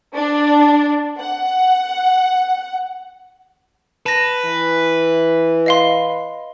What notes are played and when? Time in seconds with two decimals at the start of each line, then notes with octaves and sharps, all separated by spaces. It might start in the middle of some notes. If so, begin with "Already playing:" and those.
0.15 D4
1.21 F#5
4.06 B4 A5 A#6
4.45 E3
5.66 D#5 F5 C6